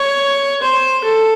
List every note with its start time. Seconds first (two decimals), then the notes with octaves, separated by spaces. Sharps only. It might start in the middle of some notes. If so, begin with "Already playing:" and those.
Already playing: C#5
0.62 C5
1.04 A4